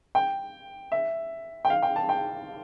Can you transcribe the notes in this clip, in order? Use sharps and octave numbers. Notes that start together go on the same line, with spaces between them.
G5
E5
G5
F5
G5
A5
G5